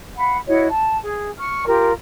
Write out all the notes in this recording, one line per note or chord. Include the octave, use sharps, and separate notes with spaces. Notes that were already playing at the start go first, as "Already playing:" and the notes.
F5 F#5 B5
E4 F#4 C#5 D#5
A5
G#4
C#6 F6
F4 G4 A#4